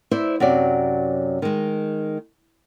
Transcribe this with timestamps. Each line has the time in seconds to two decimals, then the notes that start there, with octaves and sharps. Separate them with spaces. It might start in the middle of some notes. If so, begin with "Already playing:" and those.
0.11 E4 C5 D5 E5
0.40 F#2 C3 F#3 D5
1.42 D#3 G#3